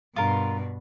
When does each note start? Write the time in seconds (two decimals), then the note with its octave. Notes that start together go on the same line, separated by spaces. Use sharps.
0.16 G2 B2 F4 A#4